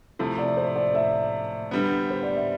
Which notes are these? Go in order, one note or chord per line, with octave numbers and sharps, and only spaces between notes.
C3 F3 A3 E4 E5
D5
C5
D5
E5
D3 G3 B3
C5
D5
E5